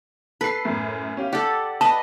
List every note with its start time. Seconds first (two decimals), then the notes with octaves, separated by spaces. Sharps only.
0.41 A4 B4 C7
0.65 F#2 A2
1.17 C#4 G4 F5
1.33 G4 A4 D5 F#5
1.81 B4 D#5 A5